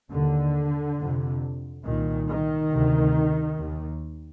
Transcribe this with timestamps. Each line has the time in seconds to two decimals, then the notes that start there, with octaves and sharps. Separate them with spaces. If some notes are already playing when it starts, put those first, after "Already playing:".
0.12 D#2 D3
0.99 F2 C3
1.85 C2 A#2 D#3
2.28 D#3
2.71 D2 C3
3.57 D#2